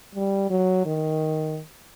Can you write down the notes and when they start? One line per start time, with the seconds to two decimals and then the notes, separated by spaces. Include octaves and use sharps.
0.15 G3
0.50 F#3
0.86 D#3